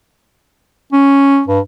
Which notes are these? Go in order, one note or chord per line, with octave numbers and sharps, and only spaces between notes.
C#4
G2